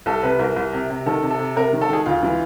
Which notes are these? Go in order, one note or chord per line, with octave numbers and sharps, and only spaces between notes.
C2 A4
C3 B4
C2 A#4
C2
C3
C3
D#3 A4
C3
A4
C3
C3 A#4
D#3
A4
D#3 G#4
D2 F4
E3